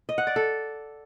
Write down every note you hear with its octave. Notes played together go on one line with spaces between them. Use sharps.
D#5
F#5
D5
A4